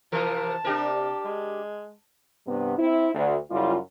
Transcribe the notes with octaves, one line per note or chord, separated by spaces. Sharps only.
C3 E3 F3 A#4 A5
C3 D4 G4 A#4
G#3
G2 C3 B3
C4 E4
D2
F#2 C#3 G3 E4 F4